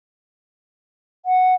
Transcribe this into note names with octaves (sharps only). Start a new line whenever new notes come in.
F#5